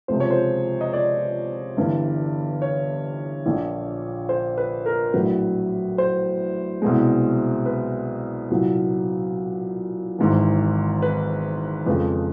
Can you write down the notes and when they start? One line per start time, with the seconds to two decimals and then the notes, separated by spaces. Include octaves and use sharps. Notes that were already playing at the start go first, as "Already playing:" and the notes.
0.08 C#2 C3 F3 G#3 C5
0.20 C#5
0.31 C5
0.81 D#5
0.93 D5
1.76 G1 G2 E3 G3
2.62 C#5
3.46 A#1 A#2 F3
4.29 C5
4.58 B4
4.86 A#4
5.14 A#1 A2 F#3 B4
5.98 C5
6.82 C2 B2 G#3
7.66 B4
8.50 C2 A#2 F#3
10.19 G#1 G#2 E3
11.02 B4
11.86 F2 C#3 F3 G#3 B4